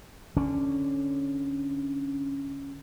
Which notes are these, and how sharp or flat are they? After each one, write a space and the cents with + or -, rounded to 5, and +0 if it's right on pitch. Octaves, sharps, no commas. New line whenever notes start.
D3 +0 C#4 +0